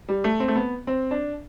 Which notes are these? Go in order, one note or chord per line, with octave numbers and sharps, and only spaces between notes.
G3
A3
C4
A3
B3
C4
D4